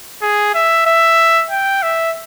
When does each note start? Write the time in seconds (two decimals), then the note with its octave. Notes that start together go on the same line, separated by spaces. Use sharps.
0.22 G#4
0.54 E5
0.86 E5
1.51 G5
1.83 E5